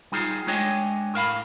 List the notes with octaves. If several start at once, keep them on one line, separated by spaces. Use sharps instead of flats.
G3 D#4 F4 G#4
G#3 A3 D4 C#5 D#5 G5
A2 A#4 F5 B5